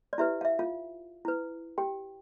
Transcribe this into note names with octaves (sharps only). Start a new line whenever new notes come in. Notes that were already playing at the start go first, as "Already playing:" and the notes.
D5
E4 G4 B4 E5
F5
E5
F4 F5
E4 B4
G4 G5